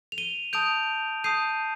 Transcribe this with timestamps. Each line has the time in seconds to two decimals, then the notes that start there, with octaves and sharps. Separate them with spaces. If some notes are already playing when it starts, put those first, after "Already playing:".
0.12 F7
0.18 D#7 G7
0.53 A5 D#6 G6 D7 F7
1.24 A5 D#6 G6 C7 D#7